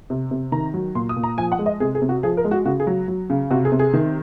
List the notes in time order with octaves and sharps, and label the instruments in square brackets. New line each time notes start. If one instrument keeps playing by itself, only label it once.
[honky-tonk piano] C3
C3
D#3 A#5
F#3
A#2 C6
D#6
A#2
A#5
F3 G#5
F#5
G#3
D#5
C3 G#4
G#4
C3
F#4
F3 G#4
A#4
G#3
F#4
C#3 F#4
G#4
F#3
F#3
C#3
C3 F#4
G#4
C3
G#4
D#3